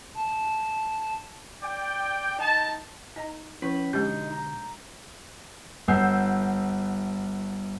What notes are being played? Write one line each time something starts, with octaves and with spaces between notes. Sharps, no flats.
A5
D5 G5
D#4 G5 A5
D#4 D#5 A#5
F3 C#4 E4 B4
B2 D3 G#3 D4 D#4 G4 G6
A#5
G1 F#5 E6 G6 C7